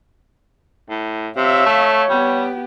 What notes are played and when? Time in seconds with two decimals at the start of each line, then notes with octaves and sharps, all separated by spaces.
0.90 A2
1.36 C3 C#5 E5 F5
1.66 A3
2.10 G3 B3 G4